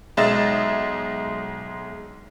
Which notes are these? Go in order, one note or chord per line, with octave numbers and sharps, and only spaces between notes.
B1 G#3 D#5 E5 A6 E7